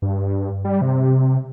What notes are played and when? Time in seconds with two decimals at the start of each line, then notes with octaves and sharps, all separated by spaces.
0.02 G2
0.65 G3
0.81 C3